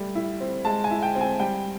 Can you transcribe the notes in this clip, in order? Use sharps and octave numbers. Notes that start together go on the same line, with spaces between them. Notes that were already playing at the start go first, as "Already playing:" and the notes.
Already playing: G3 A3
E4
C4
G#3 A5
G#5
E4
G5
C4
G#5
G3 G5